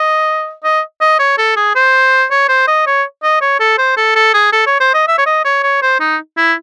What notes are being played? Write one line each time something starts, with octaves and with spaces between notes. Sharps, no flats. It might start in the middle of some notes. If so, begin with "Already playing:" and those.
Already playing: D#5
D#5
D#5
C#5
A4
G#4
C5
C#5
C5
D#5
C#5
D#5
C#5
A4
C5
A4
A4
G#4
A4
C#5
C5
D#5
E5
C#5
D#5
C#5
C#5
C5
D#4
E4